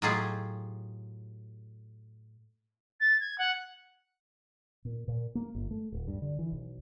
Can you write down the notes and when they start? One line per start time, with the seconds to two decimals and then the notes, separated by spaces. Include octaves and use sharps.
0.02 A2 F#3 D#4 F4 G4 G#4
3.00 A6
3.20 G#6
3.38 F#5
4.85 A#2
5.08 A#2
5.35 A#3
5.55 G1
5.71 A3
5.92 D1
6.07 G2
6.22 D3
6.39 E3
6.52 B1